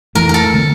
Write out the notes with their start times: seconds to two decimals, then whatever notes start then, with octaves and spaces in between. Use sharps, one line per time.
0.15 F2 E3 A3 A#4
0.29 A4 A#4
0.54 D3 A3 C4